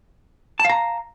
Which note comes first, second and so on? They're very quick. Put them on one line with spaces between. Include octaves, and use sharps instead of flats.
A5 F5 A#5